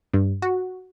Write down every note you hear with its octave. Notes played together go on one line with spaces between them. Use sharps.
G2
F#4